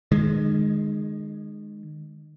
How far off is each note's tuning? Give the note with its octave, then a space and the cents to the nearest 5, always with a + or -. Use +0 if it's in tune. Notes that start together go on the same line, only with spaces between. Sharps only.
D#3 -30 G#3 +0